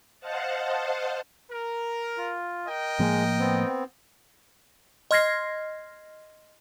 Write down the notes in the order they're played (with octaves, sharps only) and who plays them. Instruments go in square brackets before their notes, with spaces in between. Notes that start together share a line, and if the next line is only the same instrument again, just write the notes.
[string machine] C5 D#5 F5 F#5 A5
[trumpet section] A#4
[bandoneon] F4
[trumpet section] A#4 D#5 G5
[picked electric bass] A2 F3 A#3 [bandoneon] G#3
[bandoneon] B3 C4
[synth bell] D#5 C6 F6 G#6 A#6 C7